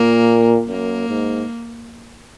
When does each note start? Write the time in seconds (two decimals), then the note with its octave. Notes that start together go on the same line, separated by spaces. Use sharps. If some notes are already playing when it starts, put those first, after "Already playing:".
Already playing: A#2 A#3
0.69 F#2 A#3
1.08 G#2